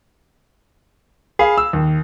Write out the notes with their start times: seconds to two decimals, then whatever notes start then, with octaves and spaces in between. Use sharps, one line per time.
1.39 G#4 F5 B5
1.58 E6
1.73 D#2